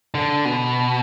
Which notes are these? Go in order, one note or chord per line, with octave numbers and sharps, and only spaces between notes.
D3
B2